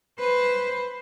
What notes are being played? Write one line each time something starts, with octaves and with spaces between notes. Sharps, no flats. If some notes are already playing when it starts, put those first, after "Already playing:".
B4 C5